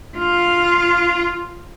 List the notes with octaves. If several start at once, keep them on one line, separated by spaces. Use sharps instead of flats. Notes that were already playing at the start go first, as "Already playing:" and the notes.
F4 F5